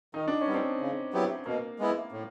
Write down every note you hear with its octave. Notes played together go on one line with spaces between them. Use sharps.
D#3 D#4
D4
C#4
G3 B3
C4 D4
C#3
F#3 B3 E4 G4
B2 A#3
G#3 B3 E4
A2